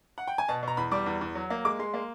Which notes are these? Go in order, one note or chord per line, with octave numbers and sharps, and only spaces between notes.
F#5
G5
G#5
B2 A5
B2 A#5
E2 B5
G3 D6
E2
E2
F#3
A#3
G#3 D6
G#3 C6
A#3